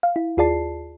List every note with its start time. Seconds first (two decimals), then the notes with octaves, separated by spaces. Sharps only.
0.03 F5
0.16 E4
0.37 D#2 F4 G#4 D5 A5 C7